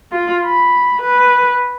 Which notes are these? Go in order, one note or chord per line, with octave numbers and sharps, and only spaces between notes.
F4
B5
B4